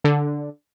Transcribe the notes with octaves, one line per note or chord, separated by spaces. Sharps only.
D3